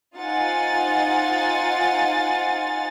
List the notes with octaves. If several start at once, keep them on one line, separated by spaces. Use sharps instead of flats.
D#4 F4 C5 F#5 G#5 A6